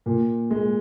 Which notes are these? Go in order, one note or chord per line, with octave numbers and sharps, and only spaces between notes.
A#2
G#3